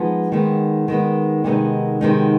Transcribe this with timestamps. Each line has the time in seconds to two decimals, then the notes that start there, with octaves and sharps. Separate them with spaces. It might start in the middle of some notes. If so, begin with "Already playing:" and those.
Already playing: F3 G#3 B3 D#4
0.32 D#3 G#3 B3
0.88 D#3 G#3 B3
1.44 C3 D#3 G#3 B3 D#4
2.01 C3 D#3 G#3 B3 D#4